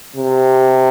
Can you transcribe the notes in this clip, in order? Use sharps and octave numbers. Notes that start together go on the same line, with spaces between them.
C3